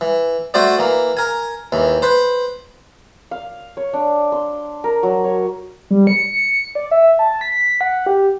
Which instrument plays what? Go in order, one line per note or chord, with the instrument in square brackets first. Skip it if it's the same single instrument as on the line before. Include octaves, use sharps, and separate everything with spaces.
[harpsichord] E3
A3 F#4 C5 D5
E3 A#3
A#4 G#5
D#2 E3
B4 C5
[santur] F5
C#5
D4
C6
A#4
F#3
C#5
[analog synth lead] G3
C#7
D5
E5
A5
B6
F#5
G4